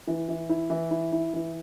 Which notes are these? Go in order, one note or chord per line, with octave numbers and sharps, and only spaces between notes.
E3
E3
E4
E3
E4
E4
E3